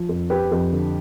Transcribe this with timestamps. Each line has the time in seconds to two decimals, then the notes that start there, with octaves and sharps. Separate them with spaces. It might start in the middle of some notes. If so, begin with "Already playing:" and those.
Already playing: F3
0.09 F2
0.30 C4 G4 B4
0.52 F2
0.72 D3